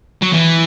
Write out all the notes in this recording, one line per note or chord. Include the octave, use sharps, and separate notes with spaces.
F#3
E3